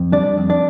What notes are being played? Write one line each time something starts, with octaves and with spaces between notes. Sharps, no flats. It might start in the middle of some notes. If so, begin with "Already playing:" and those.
Already playing: F2
G3 D4 D5
F2
D4 D5